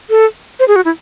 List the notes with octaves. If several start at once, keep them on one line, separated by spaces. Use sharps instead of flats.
A4
C5
G#4
F#4
E4